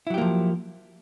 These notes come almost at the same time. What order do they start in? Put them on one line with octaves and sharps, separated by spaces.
E4 F#3 G4 A#3 F3